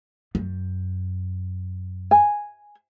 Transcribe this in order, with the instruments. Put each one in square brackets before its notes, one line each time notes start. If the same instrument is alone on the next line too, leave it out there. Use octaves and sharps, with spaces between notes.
[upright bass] F#2
[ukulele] G#5